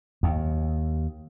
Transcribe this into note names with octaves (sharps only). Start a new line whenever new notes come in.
D#2